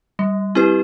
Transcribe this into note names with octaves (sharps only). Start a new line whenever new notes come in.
G3
C4 E4 G4 B4